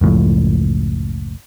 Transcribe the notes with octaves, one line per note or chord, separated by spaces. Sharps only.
F#1 C#2 A2 F3